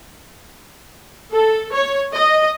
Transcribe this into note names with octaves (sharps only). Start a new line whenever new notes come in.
A4
C#5
D#5